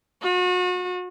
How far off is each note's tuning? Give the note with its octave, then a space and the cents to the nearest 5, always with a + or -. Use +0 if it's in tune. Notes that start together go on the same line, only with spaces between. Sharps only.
F#4 -40